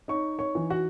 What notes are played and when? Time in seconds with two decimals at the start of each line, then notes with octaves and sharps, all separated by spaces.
0.08 D#4 C#5 C#6
0.39 C#5 C#6
0.55 E3
0.70 F#4 F#5